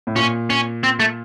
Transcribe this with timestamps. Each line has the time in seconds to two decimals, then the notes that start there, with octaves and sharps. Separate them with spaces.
0.07 A2
0.16 A#2 C#4
0.50 C#4
0.84 C4
1.00 A3